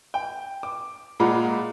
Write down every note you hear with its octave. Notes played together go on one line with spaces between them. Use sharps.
G5
D6
A#2 G#3 F4 F#5 A#5 B5